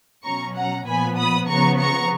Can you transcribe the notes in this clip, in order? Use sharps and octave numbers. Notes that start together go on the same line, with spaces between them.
B2 F#3 C#4 A#5 C#6
F#5 A#5
A#2 F3 B3 G#5 B5
B5 D#6
C#3 F3 B3 A#5 C#6
A#5 C#6